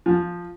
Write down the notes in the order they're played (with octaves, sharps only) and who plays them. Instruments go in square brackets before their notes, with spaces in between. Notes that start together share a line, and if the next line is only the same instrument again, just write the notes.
[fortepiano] F3